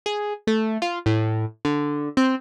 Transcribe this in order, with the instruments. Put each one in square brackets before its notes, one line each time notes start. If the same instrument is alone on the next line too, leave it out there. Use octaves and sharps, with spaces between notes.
[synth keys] G#4
A3
F4
A2
D3
C4